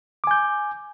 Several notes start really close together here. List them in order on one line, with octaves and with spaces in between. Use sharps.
D6 G#5 G6